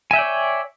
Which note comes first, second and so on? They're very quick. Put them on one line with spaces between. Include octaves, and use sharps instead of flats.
G#5 E5 G5 D5 C#5